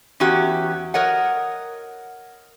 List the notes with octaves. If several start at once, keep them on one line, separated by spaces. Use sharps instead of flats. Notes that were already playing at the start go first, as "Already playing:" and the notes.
E2 C#4 F#4 G4
A#4 C#5 D#5 F#5